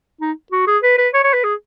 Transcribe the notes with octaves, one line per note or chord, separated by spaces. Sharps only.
D#4
F#4
G#4
B4
B4
C#5
C#5
B4
G#4